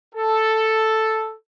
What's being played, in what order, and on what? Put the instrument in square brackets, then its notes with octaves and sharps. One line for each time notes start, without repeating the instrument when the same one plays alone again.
[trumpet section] A4